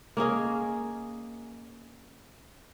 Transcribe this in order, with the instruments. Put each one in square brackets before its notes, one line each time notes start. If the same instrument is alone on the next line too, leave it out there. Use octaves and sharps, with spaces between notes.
[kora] A#3 C#4 G#4 D#5